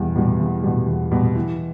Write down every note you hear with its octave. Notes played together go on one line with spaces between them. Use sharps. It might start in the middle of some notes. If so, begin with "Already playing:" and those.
Already playing: E2 B2 G3
B2 G3
E2
B2 G3
E2
B2 G3
E3